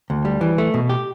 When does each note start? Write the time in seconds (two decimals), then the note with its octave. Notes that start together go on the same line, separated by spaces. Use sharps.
0.10 D2
0.25 G3
0.41 E3
0.58 A3
0.74 B2
0.89 G4